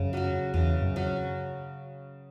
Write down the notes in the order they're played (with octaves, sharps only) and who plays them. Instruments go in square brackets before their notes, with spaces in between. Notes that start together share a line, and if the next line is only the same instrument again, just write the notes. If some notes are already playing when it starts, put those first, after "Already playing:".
Already playing: [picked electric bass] F#2 [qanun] C#3
[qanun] F#3 C#4 F#4
[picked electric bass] E2 [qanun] C#3
[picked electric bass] F#2
[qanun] F#3 C#4 F#4